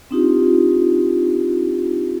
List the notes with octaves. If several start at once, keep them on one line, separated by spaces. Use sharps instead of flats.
C4 D4 D#4 F4 G4